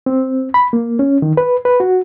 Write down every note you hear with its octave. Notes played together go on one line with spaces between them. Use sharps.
C4
B5
A#3
C#4
D#3
B4
B4
F#4